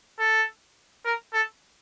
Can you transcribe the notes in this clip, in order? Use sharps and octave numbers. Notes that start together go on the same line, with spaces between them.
A4
A#4
A4